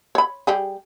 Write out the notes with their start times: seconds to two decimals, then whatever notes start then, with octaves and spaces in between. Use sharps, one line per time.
0.15 C#5 B5
0.47 G3 G4 G#4